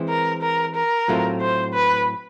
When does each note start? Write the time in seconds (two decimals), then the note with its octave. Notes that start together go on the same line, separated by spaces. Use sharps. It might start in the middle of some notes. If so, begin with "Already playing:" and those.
Already playing: E3 G#3 C4
0.09 A#4
0.42 A#4
0.75 A#4
1.08 A2 F#3 A3 C4 F4
1.41 C5
1.74 B4